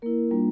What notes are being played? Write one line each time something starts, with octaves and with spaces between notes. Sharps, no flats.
A#3 E4 A#4
G3 A#3 D4 F4